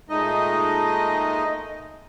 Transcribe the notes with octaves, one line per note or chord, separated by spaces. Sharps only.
A#2 G#3 A3 D#4 D#5